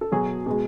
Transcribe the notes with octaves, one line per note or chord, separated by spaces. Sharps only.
A4
B2 F#3 G#4
B2 G#3 G#4